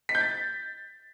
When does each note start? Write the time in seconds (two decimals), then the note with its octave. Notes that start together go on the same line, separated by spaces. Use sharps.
0.09 B6
0.15 G6
0.21 A6